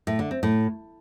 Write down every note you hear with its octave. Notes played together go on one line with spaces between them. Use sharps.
A2
D3
C4
A2